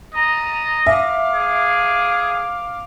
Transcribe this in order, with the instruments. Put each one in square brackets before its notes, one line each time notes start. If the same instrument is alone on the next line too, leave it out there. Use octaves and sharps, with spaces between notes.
[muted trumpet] D#5 [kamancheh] A#5
[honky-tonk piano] E5 [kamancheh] F5 D6
[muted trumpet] G#4